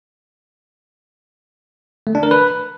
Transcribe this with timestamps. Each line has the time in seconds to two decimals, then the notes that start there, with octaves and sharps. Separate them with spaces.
2.07 A3
2.15 D4
2.23 A#4
2.31 B4